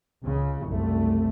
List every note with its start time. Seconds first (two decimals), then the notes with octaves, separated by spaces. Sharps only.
0.24 C#2 C#3
0.65 F#1 C2 A3